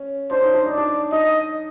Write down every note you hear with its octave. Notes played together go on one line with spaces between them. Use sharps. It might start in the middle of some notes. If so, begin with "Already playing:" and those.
Already playing: C#4
D4 C5
D#4
D4
D#4 D5
D4
D#4 D#5